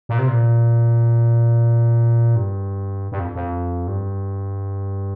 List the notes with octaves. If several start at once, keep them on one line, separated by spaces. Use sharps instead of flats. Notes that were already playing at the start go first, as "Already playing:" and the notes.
A#2
C3
A#2
G2
G2
F2
F2
G2